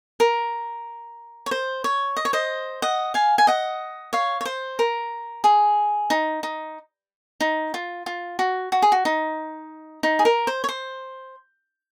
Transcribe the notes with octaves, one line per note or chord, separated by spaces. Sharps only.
A#4
C#5
C5
C#5
D#5
C#5
C5 D#5
D#5 F#5
F5 G#5
G#5
D#5 F#5
C#5 F5
C#5
C5
A#4
G#4
D#4
D#4
D#4
F4
F4
F#4
F#4
G#4
F#4
D#4
D#4
G#4
A#4
C5
C#5
C5